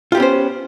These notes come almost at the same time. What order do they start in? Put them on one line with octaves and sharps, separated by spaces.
F4 G4 B3 C#4 C5